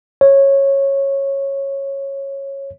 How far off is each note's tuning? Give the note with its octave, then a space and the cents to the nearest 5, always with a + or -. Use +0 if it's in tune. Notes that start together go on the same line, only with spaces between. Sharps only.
C#5 -10